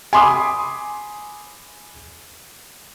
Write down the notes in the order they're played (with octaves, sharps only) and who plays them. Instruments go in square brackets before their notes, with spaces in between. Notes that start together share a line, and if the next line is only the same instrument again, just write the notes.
[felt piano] G#5 B5 C6 D6 D#6